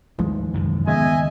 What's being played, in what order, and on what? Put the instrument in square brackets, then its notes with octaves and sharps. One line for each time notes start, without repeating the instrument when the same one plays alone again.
[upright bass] D#2 G#2 [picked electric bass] E3 F3 G#3
[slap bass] C2 F#2 A2
[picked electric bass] C#3 G#3 [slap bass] B3 [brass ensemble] D#5 E5 G#5